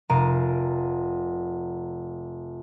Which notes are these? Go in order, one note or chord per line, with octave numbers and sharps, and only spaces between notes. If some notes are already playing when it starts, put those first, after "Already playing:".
F1 A#4 F5 A#5 D7 D#7